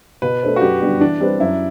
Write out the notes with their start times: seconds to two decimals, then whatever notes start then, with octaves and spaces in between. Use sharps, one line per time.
0.22 B2 B4
0.42 A3 D4 A4 C5
0.56 F#4
0.61 F#2 G4
0.81 D3 G3 B3 D4
1.01 E3 D4
1.20 G3 C4 G4 B4
1.40 F#2 E4